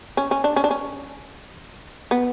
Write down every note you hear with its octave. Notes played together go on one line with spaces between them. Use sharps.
C#4
C#4
D4
C#4
D4
C#4
B3